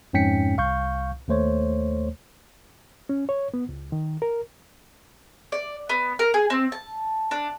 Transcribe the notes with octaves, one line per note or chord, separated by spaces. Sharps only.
F2 G#2 C#4 G5 B6 C#7
C2 F5 C#6 G6
D#2 A3 C5 C#5
C#4
C#5
B3
C#2
D#3
A#4
D5
B3
A#4
G#4
C4
A5
D4